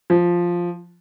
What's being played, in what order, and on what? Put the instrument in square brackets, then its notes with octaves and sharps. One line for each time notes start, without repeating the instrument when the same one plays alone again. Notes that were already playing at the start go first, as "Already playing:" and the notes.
[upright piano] F3